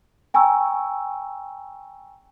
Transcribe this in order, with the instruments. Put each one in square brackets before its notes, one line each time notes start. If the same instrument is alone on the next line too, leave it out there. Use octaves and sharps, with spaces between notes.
[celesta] G5 G#5 A#5 C#6 E6